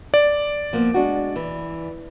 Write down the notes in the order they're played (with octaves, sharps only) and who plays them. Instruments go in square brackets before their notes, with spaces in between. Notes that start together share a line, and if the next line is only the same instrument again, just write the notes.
[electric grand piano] D5
[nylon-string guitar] F3 A#3 B3
G#3 D4 F#4
E3